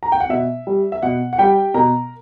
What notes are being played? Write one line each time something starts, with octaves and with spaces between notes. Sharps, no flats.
A#5
G5
F#5
B2 E5
G3
E5
B2 F#5
F#5
G3 G4 G5
B2 A#4 A#5